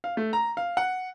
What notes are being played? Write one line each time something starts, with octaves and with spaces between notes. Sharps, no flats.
F5
A3
A#5
F5
F#5